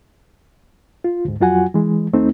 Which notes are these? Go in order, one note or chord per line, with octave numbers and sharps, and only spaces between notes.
F4
D2 G#2
F2 F#3 F4 F#4 F#5 G#5
E3 G#3
D#2 A3 C4 D#4